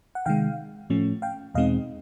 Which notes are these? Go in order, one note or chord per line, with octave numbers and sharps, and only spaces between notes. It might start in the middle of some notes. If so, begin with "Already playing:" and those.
F#5
C3 D#3 G#3 F5 G5
A2 F3 A3 C#4
F5 G5
E2 B2 G#3 C4 D#4 D#5 F5